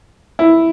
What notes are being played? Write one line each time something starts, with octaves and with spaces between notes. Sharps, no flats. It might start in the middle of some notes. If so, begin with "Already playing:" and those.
E4